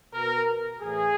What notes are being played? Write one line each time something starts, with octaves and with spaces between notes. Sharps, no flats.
B2 A#4
A2 E3 G#4